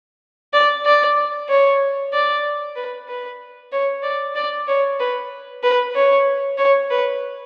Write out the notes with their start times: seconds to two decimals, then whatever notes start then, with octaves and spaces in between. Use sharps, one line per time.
0.53 D5
0.86 D5
1.49 C#5
2.13 D5
2.76 B4
3.08 B4
3.72 C#5
4.03 D5
4.36 D5
4.68 C#5
5.00 B4
5.63 B4
5.95 C#5
6.58 C#5
6.91 B4